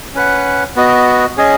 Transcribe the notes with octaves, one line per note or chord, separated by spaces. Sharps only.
C#4 B4 F#5
B3 F#4 D#5
C#4 G#4 D#5